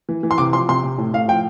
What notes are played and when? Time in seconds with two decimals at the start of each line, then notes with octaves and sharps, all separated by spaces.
0.09 E3
0.23 E3
0.31 C6
0.38 C3 D6
0.53 F3 C6
0.69 C3 C6
0.84 C3
0.98 A2
1.13 A2 F5
1.28 F3 G5